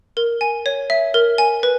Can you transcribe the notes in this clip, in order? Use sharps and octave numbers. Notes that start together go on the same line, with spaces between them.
A#4
G#5
C#5
E5
A#4
G#5
B4